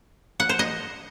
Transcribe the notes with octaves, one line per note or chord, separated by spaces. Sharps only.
F#5
C5
D#5